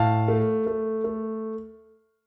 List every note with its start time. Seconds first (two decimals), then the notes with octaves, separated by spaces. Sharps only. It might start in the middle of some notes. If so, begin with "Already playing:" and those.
Already playing: A2 F5 A5
0.28 A3
0.67 A3
1.04 A3